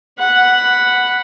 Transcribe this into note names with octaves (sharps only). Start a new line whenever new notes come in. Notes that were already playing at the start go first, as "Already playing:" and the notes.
F#5 B5